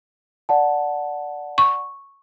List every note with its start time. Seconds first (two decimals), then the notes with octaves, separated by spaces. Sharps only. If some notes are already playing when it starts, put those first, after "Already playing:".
0.49 D5 F#5 A5
1.58 C#6